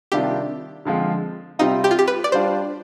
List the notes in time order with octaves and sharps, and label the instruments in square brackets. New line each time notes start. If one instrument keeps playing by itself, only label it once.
[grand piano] C3 D#3 G3 D4 F4 [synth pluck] G4
[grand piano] D3 F3 G#3 C4 F4
[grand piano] C3 G3 C4 F4 [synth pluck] D#4
[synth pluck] G4
F4
G4
B4
D5
[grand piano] G3 D4 F4 [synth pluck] C5